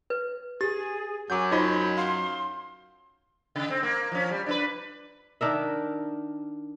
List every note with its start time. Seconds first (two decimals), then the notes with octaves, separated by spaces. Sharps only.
0.10 B4
0.61 G4 G#4 A6
1.30 F#2 F#3 G#5 D6 G6
1.51 D#4 F4 C5 C#5 D#5 B5 C6
1.97 F5 C6
3.56 C#3
3.70 C4
3.83 A#3
4.11 F3 C#4
4.31 G3
4.46 D4 E4 B4
5.41 D#3 D4 A#4 E5